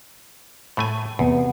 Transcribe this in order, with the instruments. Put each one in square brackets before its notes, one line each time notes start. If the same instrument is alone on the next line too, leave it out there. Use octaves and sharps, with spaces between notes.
[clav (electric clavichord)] A2 A3 G#5
[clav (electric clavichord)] E2 [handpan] C3 B3